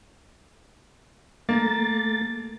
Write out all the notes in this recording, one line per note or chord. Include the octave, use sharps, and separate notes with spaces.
A3 A#3 A6